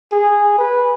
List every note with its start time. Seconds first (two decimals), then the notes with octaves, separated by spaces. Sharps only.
0.12 G#4
0.58 B4